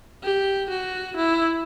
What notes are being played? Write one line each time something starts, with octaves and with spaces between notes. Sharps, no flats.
G4
F#4
E4